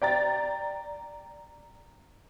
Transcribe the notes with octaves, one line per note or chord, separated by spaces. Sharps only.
D5 G5 A#5 A6